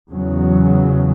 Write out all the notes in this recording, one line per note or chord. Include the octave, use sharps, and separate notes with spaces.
E2 C#3 F#3